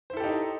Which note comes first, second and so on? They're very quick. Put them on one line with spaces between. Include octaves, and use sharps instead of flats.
C5 E4 A4 G4 D#4